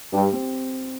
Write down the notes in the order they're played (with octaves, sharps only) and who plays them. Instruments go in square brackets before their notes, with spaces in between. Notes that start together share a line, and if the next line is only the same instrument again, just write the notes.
[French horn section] G2 [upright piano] G4
[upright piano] C4